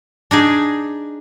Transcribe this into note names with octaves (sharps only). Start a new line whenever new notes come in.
D4 D#4 G#4